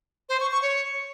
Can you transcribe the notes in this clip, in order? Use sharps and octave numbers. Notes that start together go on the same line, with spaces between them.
C5
C#6
C#6
C#5